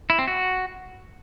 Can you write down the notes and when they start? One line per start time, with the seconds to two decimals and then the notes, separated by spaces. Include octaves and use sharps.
0.10 E4
0.19 C4
0.28 F#4